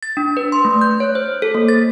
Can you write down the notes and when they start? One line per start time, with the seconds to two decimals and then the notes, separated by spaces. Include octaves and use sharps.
0.03 A6
0.17 D4
0.37 B4
0.52 C6
0.65 A3
0.81 G6
1.00 C#5
1.15 C5
1.42 A4
1.55 A#3
1.69 A6